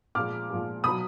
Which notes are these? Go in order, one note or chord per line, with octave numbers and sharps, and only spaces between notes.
A#2 F3 G#3 D6 F6
A#2 F3 G#3
B2 F#3 B5 D#6